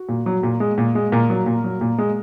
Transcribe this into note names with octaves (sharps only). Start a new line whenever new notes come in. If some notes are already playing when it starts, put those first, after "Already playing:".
Already playing: F#4
A#2
F#3
A#2
G#3
A#2
G#3
A#2 A#4
F#3
A#2
F#3
A#2
G#3